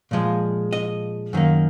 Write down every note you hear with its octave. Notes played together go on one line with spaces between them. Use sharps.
A#2 F3 G#3
D#5
F#2 D#3 A#3